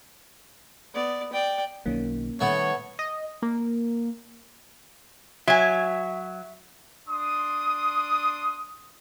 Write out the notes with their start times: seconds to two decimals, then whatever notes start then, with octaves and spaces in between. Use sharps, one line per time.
0.94 B3 D5
1.33 D5 G5
1.86 B1 D#3 F#3 A#3 C#4
2.41 D#3 G3 A3 B3 C#5
2.99 D#5
3.42 A#3
5.48 F#3 E5 G#5
7.07 D4 C6 D#6